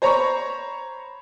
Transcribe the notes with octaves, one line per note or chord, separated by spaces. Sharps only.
C5 C#5 A#5 B5 C#6